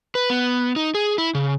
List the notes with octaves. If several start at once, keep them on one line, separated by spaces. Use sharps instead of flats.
B4
B3
D#4
G#4
E4
C#3